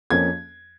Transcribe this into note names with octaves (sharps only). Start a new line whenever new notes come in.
F2 F3 A#3 C#4 G#6